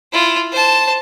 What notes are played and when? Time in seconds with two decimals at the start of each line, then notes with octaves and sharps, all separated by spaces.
0.13 E4 F4
0.52 C5 A5